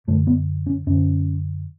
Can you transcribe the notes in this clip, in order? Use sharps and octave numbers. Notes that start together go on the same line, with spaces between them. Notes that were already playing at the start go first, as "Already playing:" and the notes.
F#2 D3 A3
B3
C#4
F#2 D3 C#4